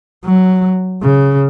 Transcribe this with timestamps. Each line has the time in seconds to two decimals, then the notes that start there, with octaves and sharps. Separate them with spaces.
0.25 F#3
1.02 C#3